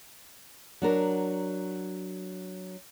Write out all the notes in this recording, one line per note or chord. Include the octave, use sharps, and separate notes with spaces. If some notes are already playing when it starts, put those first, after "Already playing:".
F#3 D4 A#4